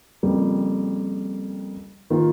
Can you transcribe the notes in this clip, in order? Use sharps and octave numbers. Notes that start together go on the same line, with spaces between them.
F2 C#3 G3 A#3
D#3 A#3 F4